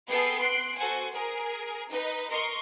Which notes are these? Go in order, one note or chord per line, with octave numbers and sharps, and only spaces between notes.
B3 G#4 A4 G5 C7
C6 F#6 C7 D7
F#4 A4 C5 F#5 G#5
G#4 A#4
D#4 B4
A#4 D#5 C6 C#6